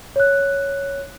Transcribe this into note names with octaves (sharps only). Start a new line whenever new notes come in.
C#5 F#6